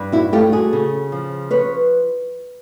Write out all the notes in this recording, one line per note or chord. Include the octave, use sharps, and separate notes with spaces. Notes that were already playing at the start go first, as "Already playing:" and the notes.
Already playing: G2
E4 F#4
A3 F4 G4
F#4 G#4
C#3
F3
B4 C#5